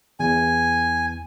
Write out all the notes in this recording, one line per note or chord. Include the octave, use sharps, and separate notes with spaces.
E2 G#5